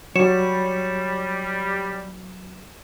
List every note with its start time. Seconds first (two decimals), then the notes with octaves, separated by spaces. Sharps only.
0.16 F#3 G3 C#5 E7